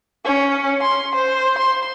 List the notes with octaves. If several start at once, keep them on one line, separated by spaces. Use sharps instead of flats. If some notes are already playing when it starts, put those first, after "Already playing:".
C#4
C6
C5
C6